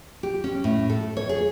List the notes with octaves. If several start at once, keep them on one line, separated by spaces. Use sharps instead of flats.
G4
C#4
A2
A4
C#5
G#4